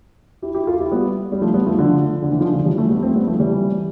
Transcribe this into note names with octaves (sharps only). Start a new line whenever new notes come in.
E4 G4
E4 G4
F4 A4
E4 G4
G3 B3
G3
F3 A3
G3 B3
F3 A3
D3 F3
D3
E3
D3 F3
D3 F3
E3 G3
F3 A3
G3 B3
A3 C4
G3 B3
F3 A3
E3 G3